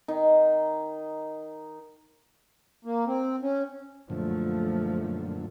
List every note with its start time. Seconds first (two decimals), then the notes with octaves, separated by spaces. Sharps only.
0.08 D#3 D#4
2.85 A#3
3.07 C4
3.42 C#4
4.10 F#2 A#2 D3 F3 A3